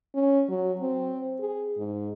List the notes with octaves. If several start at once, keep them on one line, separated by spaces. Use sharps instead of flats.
C#4
F#3
C4
G#4
G#2